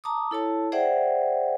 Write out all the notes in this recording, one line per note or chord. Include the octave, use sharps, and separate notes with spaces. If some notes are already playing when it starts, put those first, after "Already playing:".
A5 A#5 D6 D#6
E4 A4 C#5 A5
G#4 C5 D5 E5 F#5 G5